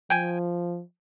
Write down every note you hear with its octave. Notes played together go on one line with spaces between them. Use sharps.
F3 G5 G#5